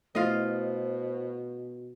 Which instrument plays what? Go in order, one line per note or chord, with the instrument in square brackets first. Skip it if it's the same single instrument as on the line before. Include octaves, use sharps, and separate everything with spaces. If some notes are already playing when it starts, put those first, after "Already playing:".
[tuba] B2 [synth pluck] A3 E4 F6 [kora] F4 D#5 [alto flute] C5